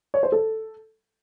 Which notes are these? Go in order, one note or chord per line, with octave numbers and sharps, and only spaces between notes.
C#5
C5
A4